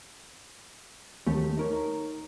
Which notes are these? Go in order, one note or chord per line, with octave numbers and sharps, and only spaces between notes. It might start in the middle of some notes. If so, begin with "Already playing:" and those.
D#2 A3 G4
D#4 A#4 C#5